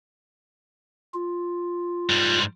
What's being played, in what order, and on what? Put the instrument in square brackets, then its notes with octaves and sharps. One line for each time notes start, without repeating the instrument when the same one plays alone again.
[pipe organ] F4
[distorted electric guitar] G#2 G3